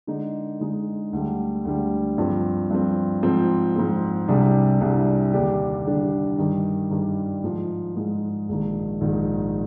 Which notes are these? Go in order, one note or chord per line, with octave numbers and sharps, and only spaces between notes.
D3 G#3 D#4
D3 G#3 D#4
D2 D3 G3
D2 D3 G3
G2 F3 C4
G2 F3 C4
G#2 F3 C4
G#2 F3 C4
C2 C3 G3 D4 G#4
C2 C3 G3 D4 G#4
D#2 D3 G3 D4 G4
D#2 D3 G3 D4 G4
G2 D#3 G3
G2 D#3 G3
G#2 F3 G#3
G#2 F3 G#3
A#1 G#2 D#3
A#1 G#2 D#3